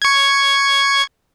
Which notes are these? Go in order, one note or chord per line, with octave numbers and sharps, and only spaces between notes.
C#6 G#6